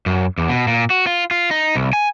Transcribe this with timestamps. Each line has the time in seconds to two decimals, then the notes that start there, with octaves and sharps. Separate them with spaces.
0.06 F#2
0.38 E2
0.49 B2
0.68 A#2
0.90 F#4
1.07 F4
1.31 F4
1.51 D#4
1.76 C2
1.93 G#5